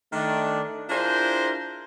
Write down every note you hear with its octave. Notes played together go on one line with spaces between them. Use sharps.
D#3 A3 D4
D4 E4 F4 G#4 A#4 C5